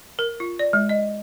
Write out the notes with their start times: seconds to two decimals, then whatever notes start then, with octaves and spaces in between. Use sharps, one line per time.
0.19 A#4
0.40 F4
0.59 D5
0.73 G#3
0.89 D#5